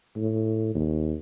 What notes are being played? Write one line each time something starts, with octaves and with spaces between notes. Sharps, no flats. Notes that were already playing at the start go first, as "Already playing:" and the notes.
A2
D#2